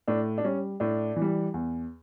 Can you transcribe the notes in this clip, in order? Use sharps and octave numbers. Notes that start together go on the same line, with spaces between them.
A2 D4
D4
G3 C#4
A2 D4
E3
G3
E2